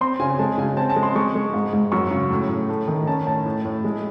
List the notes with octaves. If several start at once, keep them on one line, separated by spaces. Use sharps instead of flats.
C4 C6
C#3 G#5
G#3 A5
C#3 G#5
C4 A5
A5
G#3
C6
G#3 C#6
G#3
G#2
G#2
F#2 C#6
C#3
A2
A2
A3
D#3
C#4 A5
A2 A5
A2
A2
G#3